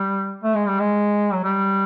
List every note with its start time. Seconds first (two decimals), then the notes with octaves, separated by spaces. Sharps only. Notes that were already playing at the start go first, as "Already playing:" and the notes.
Already playing: G3
0.44 A3
0.55 G#3
0.67 G3
0.80 G#3
1.33 F#3
1.44 G3